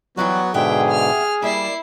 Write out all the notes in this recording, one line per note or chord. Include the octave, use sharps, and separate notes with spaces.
E3 F#3 G3 B3 F#4 D5
G#2 B2 D3 G4 G#4 E5 F#5 G5
F6
G3 A#3 E4 D5 C7